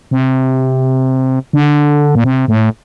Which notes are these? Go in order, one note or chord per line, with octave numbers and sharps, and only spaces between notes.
C3
D3
A#2
C3
A2